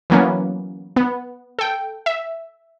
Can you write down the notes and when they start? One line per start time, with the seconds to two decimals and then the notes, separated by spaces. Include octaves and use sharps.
0.10 E3 F#3 A#3 B3 C#4
0.96 B3
1.59 A4 G5
2.06 E5